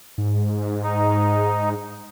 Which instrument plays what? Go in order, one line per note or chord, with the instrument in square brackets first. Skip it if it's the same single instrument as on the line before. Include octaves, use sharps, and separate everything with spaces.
[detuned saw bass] G#2
[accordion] D#4